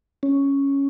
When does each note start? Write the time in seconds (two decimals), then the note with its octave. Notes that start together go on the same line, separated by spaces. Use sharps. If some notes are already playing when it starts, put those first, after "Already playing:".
0.23 C#4